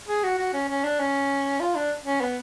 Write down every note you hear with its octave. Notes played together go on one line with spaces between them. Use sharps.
G#4
F#4
F#4
C#4
C#4
D4
C#4
F4
D4
C#4
B3